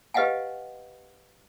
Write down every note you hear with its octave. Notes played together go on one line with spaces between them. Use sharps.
G4 B4 D#5 F5 F#5 G#5